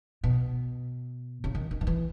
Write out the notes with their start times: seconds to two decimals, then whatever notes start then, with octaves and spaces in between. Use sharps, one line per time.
0.24 B2
1.44 C#3
1.55 D#3
1.71 D#3
1.81 D#3
1.87 E3